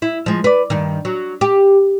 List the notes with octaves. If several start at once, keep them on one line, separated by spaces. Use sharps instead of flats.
E4
F3 G#3
B4 D5
G2 D#3
F#3
G4